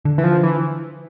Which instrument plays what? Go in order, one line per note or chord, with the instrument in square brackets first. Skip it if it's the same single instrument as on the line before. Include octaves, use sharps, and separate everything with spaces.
[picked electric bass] D3
[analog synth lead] E3
F3
E3